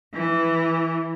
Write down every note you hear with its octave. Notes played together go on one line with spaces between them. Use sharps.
E3